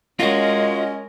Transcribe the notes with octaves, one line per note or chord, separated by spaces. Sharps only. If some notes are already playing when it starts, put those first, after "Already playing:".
G#3 C#4 F4 F#4 A#4 D#5